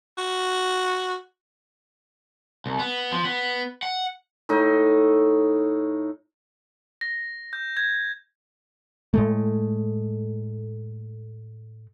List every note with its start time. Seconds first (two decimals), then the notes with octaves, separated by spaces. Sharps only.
0.18 F#4
2.66 C2
2.79 B3
3.12 F3
3.24 B3
3.83 F#5
4.49 A2 D#4
7.01 A#6
7.53 G6
7.77 G#6
9.14 A2 G#3 A3